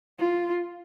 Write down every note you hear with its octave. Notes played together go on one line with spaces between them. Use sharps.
F4